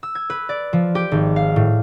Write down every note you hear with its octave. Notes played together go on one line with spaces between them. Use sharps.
E6
G#6
B4
D5
F3
G4
G#1
F5
A2